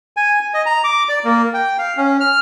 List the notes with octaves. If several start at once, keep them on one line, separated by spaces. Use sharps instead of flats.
G#5
D#5
A#5
D6
D5
A#3
G5
F5
C#4
F6